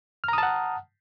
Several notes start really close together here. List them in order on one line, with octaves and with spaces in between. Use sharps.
F6 A#5 D#6 A5 F#5